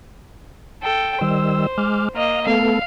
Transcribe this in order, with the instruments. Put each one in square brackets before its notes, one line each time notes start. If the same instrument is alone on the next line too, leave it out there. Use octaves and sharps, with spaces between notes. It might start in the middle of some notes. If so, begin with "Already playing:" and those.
[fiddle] A4 G5
[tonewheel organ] D#3 G3 E6 [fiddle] C5
[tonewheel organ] G#3 D6 F6
[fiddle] A#3 D#5 [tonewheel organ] F5
[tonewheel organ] A3 B3 A4 [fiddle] F5